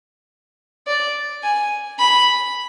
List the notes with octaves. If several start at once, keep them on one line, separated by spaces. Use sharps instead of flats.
D5
G#5
B5